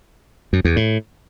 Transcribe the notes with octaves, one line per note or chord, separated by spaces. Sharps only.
F#2
E2
A2